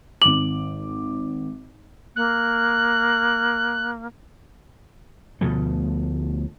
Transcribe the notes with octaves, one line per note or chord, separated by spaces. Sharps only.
G#1 D6 F#7
A#3 F#6
D2 B2 F3 A3